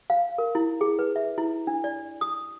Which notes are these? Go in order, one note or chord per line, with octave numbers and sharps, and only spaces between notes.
F5
A#4
E4
G#4
B4
E5
E4
D4
D5
D#6